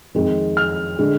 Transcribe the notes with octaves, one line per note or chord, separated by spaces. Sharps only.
F2 D#3 G#3
F6
D3 G#3